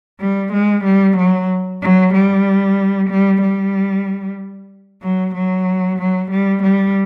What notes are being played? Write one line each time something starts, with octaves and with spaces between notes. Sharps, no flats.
G3
G#3
G3
F#3
F#3
G3
G3
G3
F#3
F#3
F#3
G3
G3